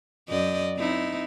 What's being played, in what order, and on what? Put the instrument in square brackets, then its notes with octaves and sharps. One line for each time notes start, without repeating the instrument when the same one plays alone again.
[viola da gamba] F#2 D5 D#5
C4 D#4 E4